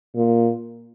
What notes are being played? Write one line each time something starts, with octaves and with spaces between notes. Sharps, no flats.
A#2